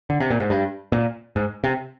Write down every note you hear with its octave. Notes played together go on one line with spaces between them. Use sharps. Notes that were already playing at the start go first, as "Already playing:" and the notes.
D3
C3
A#2
G#2
G2
A#2
G#2
C3